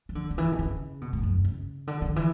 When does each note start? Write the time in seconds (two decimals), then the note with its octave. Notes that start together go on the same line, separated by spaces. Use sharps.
0.09 E3
0.15 D3
0.31 D3
0.38 E3
0.52 B2
0.59 C#3
1.01 B2
1.13 A2
1.23 F#2
1.45 C#3
1.87 D3
2.02 D3
2.16 E3